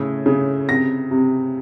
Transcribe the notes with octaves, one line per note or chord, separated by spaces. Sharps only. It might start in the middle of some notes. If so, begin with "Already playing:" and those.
Already playing: A2 C#3
C#3
C3 A#6
C3